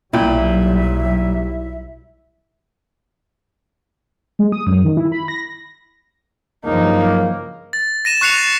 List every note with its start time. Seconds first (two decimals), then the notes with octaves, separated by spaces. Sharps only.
0.13 B1 A#2 F#3 G3 E4 E5 G5
4.39 G#3
4.52 D#6
4.67 F#2
4.85 D#3
4.97 E4
5.12 B5
5.28 A#6
6.65 G2 C#3 F3 F#3 A#3 D#4
7.73 A6
8.05 A#6 D#7 E7
8.21 C#6 F#6 C7 C#7 F7
8.38 A6